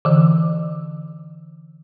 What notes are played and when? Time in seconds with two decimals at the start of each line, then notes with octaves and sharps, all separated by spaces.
0.05 D3 E3